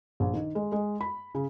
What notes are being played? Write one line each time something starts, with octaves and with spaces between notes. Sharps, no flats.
A#1
D#3
G#3
G#3
B5
C#3